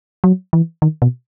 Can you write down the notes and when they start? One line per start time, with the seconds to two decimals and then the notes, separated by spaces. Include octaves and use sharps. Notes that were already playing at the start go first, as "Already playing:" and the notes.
0.24 F#3
0.53 E3
0.82 D#3
1.02 B2